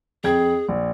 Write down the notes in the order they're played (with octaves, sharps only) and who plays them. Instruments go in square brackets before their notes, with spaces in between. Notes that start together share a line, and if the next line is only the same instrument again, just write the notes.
[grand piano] F2 G5 G#6 [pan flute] G#4
[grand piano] A#1